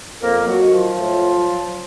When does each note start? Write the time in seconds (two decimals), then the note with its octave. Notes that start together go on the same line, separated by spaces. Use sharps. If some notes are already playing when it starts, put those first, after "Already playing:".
0.22 F2 A#3 A#4
0.47 F#3 F#4
0.60 D#3 F#3
0.72 F3 F4
0.97 A2
1.35 F#3